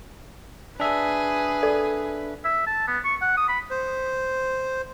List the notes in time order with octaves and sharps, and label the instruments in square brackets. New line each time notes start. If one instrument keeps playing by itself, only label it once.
[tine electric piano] D4 E5 [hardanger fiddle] G#4 [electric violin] B4
[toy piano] A4 D5
[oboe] E5
A5
B3
C#6
F#5
D#6
B5
[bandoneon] C5